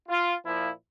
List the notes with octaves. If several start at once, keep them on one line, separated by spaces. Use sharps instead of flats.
F4
A#2 F3 E4